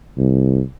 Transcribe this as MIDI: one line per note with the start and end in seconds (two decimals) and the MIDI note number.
0.17 0.61 36